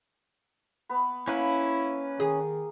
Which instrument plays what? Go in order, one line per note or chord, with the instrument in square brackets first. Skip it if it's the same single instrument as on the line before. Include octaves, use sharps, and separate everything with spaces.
[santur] B3 B4
[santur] A#3 F5 [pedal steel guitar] C#4 B4 [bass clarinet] E4
[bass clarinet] D#3 [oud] G#4